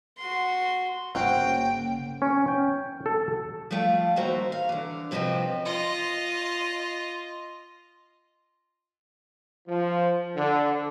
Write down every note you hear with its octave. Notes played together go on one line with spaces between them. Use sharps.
F#4 C6
G1 C#3 A#3 C#4 F#4 C5 G5
C#4
G5
A4
F3 G3 A3 F4 G5
D#2 F#4 C5 E5 A#5
F5
D3 E3
F#2 C3 F3 B4 D#5 G5
F4 D#5
F3
D3